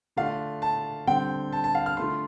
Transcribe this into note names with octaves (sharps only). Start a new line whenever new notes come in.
D3 A3 D4 F4 F5
A5
D3 G3 C4 G5
A5
A5
F5
F6
D3 A3 F4 C6